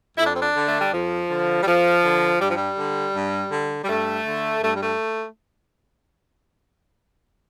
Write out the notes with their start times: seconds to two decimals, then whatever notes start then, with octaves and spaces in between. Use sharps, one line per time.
0.17 F2 E4
0.25 D4
0.32 C4
0.39 D4
0.55 D3
0.66 A3
0.79 G3
0.91 F2 F3
1.29 D3
1.62 G3
1.65 F2 F3
2.04 D3
2.40 G2 G3
2.47 F3
2.54 G3
2.78 D3
3.14 G2
3.52 D3
3.83 G3
3.88 G2 A3
4.26 D3
4.62 G2 A3
4.72 G3
4.82 A3